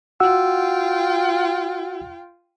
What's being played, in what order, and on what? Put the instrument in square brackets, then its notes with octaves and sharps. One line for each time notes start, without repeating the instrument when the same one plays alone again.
[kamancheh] F4 G5 [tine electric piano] F#4 F#5 E6